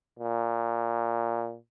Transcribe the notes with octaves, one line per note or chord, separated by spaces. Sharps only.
A#2